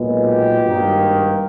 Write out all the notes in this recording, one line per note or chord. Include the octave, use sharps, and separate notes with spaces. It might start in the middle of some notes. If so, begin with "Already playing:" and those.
Already playing: B1 A#2 G#3 B3
G4
G#1 G2 D#3 A#3